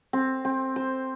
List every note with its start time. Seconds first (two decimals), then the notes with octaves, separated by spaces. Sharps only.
0.13 C4
0.45 C4
0.76 C5